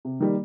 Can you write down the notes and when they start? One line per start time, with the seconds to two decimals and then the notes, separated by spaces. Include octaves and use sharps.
0.05 C3
0.20 D#3 G3 A#3